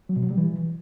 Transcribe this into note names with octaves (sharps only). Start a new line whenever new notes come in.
F#3
B2
F#3
G3
E3